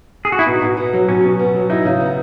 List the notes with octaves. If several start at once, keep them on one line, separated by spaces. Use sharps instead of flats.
G#4
F#4
E4
B2 D#4
B2
B3
F#3
B2 C#4
B2
B3
F#3
D#4 E4
C#3
B3